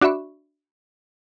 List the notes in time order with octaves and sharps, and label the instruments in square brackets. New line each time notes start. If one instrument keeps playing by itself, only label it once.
[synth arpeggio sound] D4 F#4 D5 E5 B5 C#6